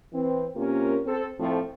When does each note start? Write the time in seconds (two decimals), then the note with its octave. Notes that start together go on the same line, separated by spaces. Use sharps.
0.13 E3 C4
0.56 C3 A#3 C#4 F4 A#4
1.06 C4 A4
1.38 F2 A2 F3 A3 C4